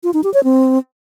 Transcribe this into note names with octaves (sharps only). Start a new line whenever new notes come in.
F4
D#4
G4
C#5
C4